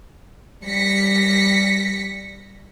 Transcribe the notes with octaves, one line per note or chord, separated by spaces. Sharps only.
G3 A#6 B6 C#7